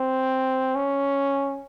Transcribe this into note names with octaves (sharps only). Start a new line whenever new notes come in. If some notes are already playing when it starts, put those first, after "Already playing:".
Already playing: C4
C#4